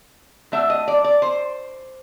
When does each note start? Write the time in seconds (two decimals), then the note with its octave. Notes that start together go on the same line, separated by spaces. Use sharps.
0.52 F#3 A3 D4 E5
0.70 D#5
0.88 D5
1.04 D5
1.22 C5